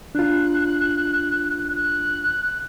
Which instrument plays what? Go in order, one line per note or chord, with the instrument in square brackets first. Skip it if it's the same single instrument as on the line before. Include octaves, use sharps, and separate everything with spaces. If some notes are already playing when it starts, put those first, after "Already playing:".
[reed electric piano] D4 F4 [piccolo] F#6
[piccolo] F#6